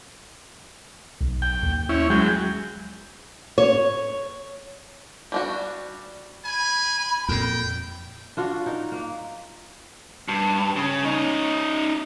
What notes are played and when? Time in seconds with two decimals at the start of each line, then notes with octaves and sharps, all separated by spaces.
1.21 B1
1.42 G5
1.63 D#2
1.89 C#4 E4
2.10 F#3 G#3 G5
3.58 C#5
5.32 G3 D4 F#4
6.45 G#5 B5
7.29 F2 A#2 G5
8.37 D4 F4 F#4
8.66 D#4 A#4
8.92 A#3
10.28 G2
10.76 C#3
11.05 C#4 D#4